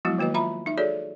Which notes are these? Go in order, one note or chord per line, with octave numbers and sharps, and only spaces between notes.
F3 F#3 G#3 B3 E4 F#4
D#3 A#3 F#4 B4 D#5
F4 E5 A#5 B5
D#4 E5
F#4 G#4 A4 C#5 D5